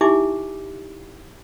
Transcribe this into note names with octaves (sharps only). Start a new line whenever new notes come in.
D#4 E4 G4 E5 G#5 D6